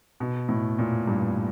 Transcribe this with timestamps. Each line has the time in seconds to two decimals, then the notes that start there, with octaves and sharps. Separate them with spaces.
0.20 B2
0.49 A2
0.79 A#2
1.07 G2